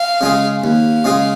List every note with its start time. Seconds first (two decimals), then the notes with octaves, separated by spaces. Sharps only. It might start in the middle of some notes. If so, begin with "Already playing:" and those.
Already playing: F5
0.21 C#3 G#3 F4 G#4
0.64 D#2 F5
1.04 C#3 G#3 F4 G#4